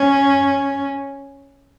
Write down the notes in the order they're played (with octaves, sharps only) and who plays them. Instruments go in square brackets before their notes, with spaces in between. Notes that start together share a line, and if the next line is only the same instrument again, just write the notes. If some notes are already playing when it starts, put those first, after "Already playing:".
Already playing: [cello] C#4